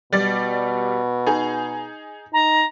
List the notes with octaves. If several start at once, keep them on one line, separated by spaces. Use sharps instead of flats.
B2 G3 D5 A6
D#4 G#4
D#4 A#5